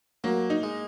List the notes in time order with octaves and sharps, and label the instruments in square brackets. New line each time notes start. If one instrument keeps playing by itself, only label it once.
[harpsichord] F#3 [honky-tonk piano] A#3
[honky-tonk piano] D#4
[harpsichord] G#3